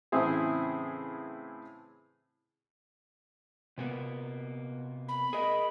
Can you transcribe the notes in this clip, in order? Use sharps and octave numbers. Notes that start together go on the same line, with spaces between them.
A2 C#3 E3 C4 E4 G#4
C3 A#3 B3
B5
G#4 A#4 D#5